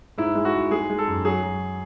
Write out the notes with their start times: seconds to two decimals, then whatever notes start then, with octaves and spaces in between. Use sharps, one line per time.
0.18 G#2 E4
0.35 G#3
0.45 F#4
0.54 G#2
0.71 G#3 G#4
0.90 G#3
0.98 A4
1.07 F#2
1.25 F#3 G#4
1.43 F#3